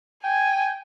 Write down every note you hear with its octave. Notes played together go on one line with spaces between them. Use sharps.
G5 G#5